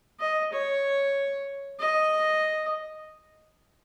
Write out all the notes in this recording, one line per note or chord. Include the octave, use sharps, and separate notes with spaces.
D#5
C#5
D#5